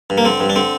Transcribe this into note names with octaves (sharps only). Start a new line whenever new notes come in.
G2
A#3
D3 C4
G2
D4
D3 C4